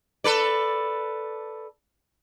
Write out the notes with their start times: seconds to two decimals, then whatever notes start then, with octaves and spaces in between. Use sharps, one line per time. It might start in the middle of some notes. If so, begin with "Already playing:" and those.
0.24 A4 B4 D5